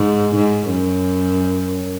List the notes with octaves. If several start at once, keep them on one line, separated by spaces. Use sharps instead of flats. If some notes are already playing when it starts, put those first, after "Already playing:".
Already playing: G#2
G#2
F#2